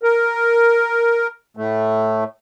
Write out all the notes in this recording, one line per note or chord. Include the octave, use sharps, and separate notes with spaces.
A#4
A2 A3